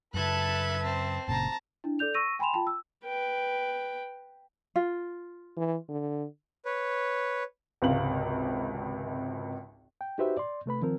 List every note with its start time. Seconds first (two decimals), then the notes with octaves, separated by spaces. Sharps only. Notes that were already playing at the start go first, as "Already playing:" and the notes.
0.14 F#2 C#3 A4 B4 E5 A5 F#6 G#6
0.83 C4 C5 A5
1.28 F#1 A#2 C#3 A5 A#5
1.84 D4 E4
1.99 A4 D5 G6 F7
2.14 C#6 E6 A#6 D#7
2.39 G5 G#5 B5 C6 E7 F7
2.53 F4 G5 A5 B5
2.67 E6
3.05 B4 G5
4.76 F4
5.57 E3
5.89 D3
6.65 B4 C#5
7.82 G#1 C#2 C3 F5 F#7
10.01 G5
10.18 D#4 F#4 G4 B4 C5 E5
10.37 D5 C6
10.66 C3 A3 B4 B5
10.82 D#3 F3 C4 A#4